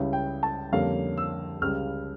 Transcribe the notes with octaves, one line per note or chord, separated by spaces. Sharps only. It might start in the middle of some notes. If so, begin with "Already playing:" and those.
Already playing: C#2 C#3 G3 C#4 E4
G5
A5
F2 D3 G3 A#3 C#4 F5
E6
C#2 C#3 G3 F6